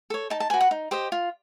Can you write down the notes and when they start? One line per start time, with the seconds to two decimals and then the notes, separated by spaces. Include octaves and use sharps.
0.10 A4 C#5
0.30 D#4 A5
0.40 A5
0.50 F#4 B4 G#5
0.61 F#5
0.71 D#4
0.91 G4 C5 D#5
1.12 F4